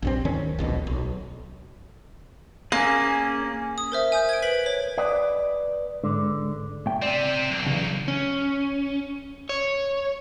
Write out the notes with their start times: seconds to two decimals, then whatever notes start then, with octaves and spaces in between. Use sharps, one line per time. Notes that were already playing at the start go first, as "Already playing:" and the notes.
0.02 A#1 G2 C4
0.25 D1 D#3 C#4
0.59 D1 A#1 B2
0.87 B1
2.72 A#3 C#4 G#4
3.78 D#6
3.92 A#4 C5 E5
4.12 G#5 D#6 G6
4.29 G#6 D7
4.42 B4 B6 F#7
4.66 C#5
4.98 B4 D5 D#5
6.04 G#2 D3 G#3
6.86 A2 G5
7.02 C4 D5 E5
7.51 B1
7.67 E2 C#3
8.08 C#4
9.49 C#5